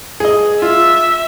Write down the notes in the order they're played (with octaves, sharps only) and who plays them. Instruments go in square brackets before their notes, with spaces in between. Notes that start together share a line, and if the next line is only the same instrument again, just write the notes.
[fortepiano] G#4 D#5
[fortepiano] F4 [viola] E5